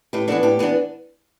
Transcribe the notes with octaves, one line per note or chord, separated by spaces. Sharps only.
A2 G4 B4
E3 B3 D4 F#4 A4
A2 G4
E3 B3 D4